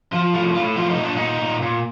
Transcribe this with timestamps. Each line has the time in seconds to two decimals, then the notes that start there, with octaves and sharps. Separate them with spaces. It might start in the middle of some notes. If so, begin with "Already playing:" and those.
0.12 F3 F4
0.34 A2 F4
0.55 A2 F4
0.76 F3 F4
0.90 D#4
0.98 A#2
1.03 D4
1.16 A#2 D#4
1.41 A#2
1.62 A#2